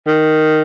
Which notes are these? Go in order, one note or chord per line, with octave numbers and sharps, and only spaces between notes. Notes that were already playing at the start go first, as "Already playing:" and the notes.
D#3